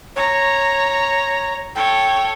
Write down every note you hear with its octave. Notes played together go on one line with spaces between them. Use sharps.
C#5 A#5
A4 C#5 G5